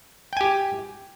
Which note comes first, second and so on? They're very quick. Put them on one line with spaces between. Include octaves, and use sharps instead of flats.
G5 G#5 G4